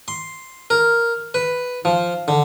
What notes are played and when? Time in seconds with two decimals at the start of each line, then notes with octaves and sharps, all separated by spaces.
0.08 C6
0.70 A#4
1.34 B4
1.85 F3
2.28 D3